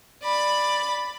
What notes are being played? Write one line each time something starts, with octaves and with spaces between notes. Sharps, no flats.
D5 B5